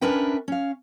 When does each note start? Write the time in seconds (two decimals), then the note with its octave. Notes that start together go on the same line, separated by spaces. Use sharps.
0.01 C#4 D4 A#4 B4 E5 G5
0.48 C#4 F5